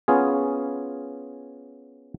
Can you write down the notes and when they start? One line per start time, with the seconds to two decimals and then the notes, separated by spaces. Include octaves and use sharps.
0.08 B3 C#4 F4 G#4